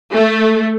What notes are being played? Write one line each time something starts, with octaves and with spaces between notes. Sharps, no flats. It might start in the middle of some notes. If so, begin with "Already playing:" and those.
A3